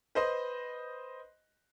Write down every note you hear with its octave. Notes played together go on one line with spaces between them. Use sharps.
B4 C5 D#5 C6